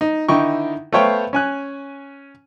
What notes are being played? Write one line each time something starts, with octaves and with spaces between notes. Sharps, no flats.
D#4
D3 D#3 D#4 E4 G5 C#6
A3 B3 C5 C#5 F5 G5
C#4 G#5 F#6